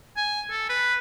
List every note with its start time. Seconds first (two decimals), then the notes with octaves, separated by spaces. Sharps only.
0.17 G#5
0.51 A4
0.69 B4